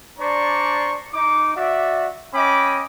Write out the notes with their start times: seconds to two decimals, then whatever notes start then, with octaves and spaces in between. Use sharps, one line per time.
0.19 D4 C5 D5 A#5 C#6
1.14 D#4 D6
1.55 F#4 D5 E5
2.34 C#4 D#5 G5 B5 D6